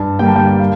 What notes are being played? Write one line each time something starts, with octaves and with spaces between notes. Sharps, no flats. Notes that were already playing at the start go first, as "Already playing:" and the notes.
Already playing: G2 A5
D3 G3 A#3 G5
A5
G5
F5